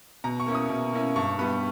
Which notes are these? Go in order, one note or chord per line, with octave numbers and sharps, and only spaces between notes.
B2 A#5
C#6
A#3 C#4 E4
D#6
B2
A#3 C#4 E4
G2 C#6
G3 B3 B5